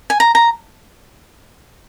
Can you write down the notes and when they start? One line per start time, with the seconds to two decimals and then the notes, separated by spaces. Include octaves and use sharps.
0.10 G#5
0.20 A#5
0.35 A#5